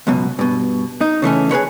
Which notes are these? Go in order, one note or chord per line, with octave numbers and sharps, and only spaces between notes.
C#2 F#2 B2
G2 B2
D#4
C#3 E3 A3 C#4
G#4 A#4 B4 C#5